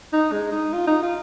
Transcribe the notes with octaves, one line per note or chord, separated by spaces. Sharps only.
D#4
G#3
D#4
F4
D#4
F4